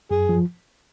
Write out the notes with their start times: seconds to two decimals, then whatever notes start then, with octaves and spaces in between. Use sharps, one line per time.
0.11 F#2 G#4
0.29 F3